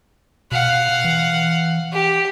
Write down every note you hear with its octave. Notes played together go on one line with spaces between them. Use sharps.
B2 F5 F#5
E3
G4